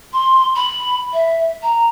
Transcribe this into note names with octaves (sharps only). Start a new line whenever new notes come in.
C6
B5
E5
A#5